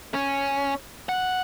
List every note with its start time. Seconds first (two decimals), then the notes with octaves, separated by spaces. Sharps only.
0.14 C#4
1.09 F#5